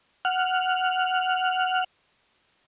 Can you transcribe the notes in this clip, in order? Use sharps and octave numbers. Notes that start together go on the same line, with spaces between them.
F#5 F6